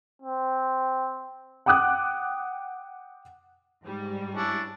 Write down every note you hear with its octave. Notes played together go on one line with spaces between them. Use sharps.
C4
F#5 G5 D6 D#6 F#6
G#2 G3
C#4 D4 E4